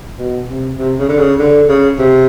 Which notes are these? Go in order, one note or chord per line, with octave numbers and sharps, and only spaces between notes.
B2
C3
C3
C#3
D3
C#3
D3
C#3
C3